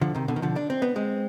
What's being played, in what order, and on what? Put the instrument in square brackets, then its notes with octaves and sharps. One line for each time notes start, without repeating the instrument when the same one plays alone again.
[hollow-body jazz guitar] D3 F3
C3 D#3
B2 D3
D#3
D3 F3
D4
C4
B3
G#3 C4